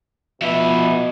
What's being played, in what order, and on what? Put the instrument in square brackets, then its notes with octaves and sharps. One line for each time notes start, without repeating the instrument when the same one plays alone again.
[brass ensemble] B2 [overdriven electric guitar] F3 E5